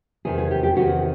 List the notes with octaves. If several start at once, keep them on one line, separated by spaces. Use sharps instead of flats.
E2 C3 D#3 G#4
G#4
G4
G4
E2 C3 D#3 F#4